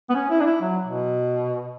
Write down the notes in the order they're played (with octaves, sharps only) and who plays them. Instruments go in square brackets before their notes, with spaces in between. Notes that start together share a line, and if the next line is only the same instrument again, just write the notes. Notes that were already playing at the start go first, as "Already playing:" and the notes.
[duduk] B3
C#4
E4
D4
E4
F#3
B2